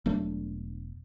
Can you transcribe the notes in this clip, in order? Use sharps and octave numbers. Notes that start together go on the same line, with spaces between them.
E1 F#3 A3 D4